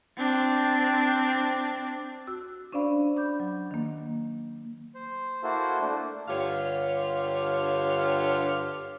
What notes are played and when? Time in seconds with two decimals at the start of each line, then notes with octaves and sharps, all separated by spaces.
0.17 C4 D4
2.27 F#4 E6
2.72 C#4 D4 C5 D5 F5 B5
3.17 B5 D6 G6
3.40 F#3
3.71 D#3 A#3
4.95 C5
5.43 A#3 E4 F#4 A4 C5
5.81 A3 D4
6.28 G2 D3 F4 G4 C#5 F5